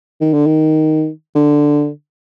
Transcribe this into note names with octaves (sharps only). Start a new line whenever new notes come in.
D#3
D3
D#3
D3